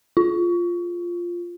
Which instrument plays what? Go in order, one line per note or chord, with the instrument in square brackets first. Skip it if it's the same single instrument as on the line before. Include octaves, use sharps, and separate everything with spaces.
[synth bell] F4